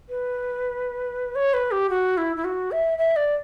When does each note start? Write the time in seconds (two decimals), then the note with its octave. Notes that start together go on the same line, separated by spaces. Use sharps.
0.09 B4
1.35 C#5
1.54 B4
1.71 G4
1.90 F#4
2.17 E4
2.36 E4
2.44 F#4
2.72 E5
2.98 E5
3.16 D5